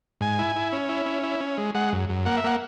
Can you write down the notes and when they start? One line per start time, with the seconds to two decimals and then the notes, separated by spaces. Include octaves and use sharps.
0.21 G#2 G#5
0.39 E4
0.56 E4
0.73 C#4
0.89 E4
1.06 C#4
1.23 E4
1.40 C#4
1.58 G#3
1.75 G#3 F#5
1.93 F#2
2.09 F#2
2.26 A#3 F#5
2.37 E5
2.44 A#3 F#5